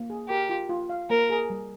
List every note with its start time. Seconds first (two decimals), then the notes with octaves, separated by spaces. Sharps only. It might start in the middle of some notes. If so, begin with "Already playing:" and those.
Already playing: A#3
0.10 G#4
0.29 G4 A#4
0.49 F4
0.70 F4
0.89 F5
1.10 A#3 A#4
1.30 G#4
1.50 G3